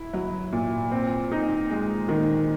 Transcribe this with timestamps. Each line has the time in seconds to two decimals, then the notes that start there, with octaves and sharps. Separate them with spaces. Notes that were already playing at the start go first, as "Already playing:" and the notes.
Already playing: E4
0.13 F#3
0.52 A#2
0.91 C4
1.32 D#4
1.71 G#3
2.09 D#3